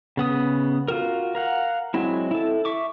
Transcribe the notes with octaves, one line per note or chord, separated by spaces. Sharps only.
C#3 B3 D#6
F4 F#4 A#4
A#4 F5 F#5
F#3 G#3 C4 E4
E4 A4
E5 C#6 D6